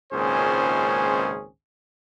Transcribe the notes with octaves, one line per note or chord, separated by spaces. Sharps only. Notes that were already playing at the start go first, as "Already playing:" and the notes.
G#1 C#2 A#2 C#4 G#4 C5